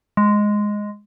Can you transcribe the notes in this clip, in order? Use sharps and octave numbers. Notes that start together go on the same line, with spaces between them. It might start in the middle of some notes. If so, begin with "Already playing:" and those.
G#3